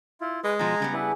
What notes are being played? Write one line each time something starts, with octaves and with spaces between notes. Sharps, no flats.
E4 F4
G#3 G#4 B4
B2 F3 G#5 A#5
C#3 G3 B3
D4 E4 F#4 G#4 B4